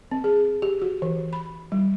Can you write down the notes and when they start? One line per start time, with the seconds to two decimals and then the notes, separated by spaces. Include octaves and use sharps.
0.11 C4
0.24 G#4
0.62 G4
0.82 F#4
1.02 E3
1.33 B5
1.72 G3